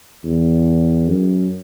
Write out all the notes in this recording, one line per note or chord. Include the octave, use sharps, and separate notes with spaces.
E2
F#2